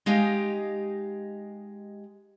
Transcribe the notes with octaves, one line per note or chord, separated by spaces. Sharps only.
G#3 D#4 G4 D#5 F5